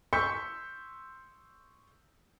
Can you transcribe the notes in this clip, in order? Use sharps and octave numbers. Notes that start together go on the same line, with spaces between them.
C6 C#6 E6 G6 B6 C#7